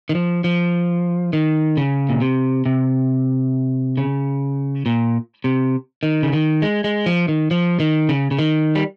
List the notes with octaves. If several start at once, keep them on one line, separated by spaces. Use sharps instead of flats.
D#3
F3
F3
D#3
C#3
A#2
C3
C3
C#3
A#2
C3
D#3
C#3
D#3
G#3
G#3
F3
D#3
F3
D#3
C#3
C#3
D#3
G3